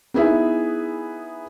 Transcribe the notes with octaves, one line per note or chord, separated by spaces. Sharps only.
B3 D#4 E4 G#4 B4 E5